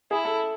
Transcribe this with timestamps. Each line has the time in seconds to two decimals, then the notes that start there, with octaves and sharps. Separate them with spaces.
0.11 E4 G#4
0.25 A4